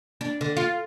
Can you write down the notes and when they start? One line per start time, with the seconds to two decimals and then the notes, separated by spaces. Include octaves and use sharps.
0.21 D4
0.41 D3
0.57 F4